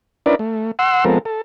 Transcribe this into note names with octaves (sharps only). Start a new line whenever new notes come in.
C#4 D4 E4 A#4 B4 D5
A3
F#5 C6 E6
F3 G#3 B3 C4 A4 A#4
A4